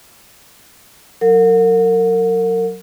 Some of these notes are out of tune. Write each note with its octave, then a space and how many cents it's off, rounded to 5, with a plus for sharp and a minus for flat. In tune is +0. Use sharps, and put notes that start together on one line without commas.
F#3 +0 A#4 -35 F#5 -35